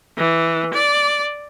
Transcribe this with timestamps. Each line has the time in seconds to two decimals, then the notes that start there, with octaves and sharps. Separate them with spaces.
0.18 E3
0.74 D5